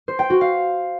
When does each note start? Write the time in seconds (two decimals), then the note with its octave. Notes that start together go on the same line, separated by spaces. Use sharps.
0.08 C5
0.19 G5
0.30 F#4
0.41 F5